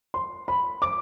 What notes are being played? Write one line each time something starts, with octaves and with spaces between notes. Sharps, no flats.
C6
B5
D6